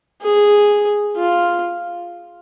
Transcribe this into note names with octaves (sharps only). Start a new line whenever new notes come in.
G#4
F4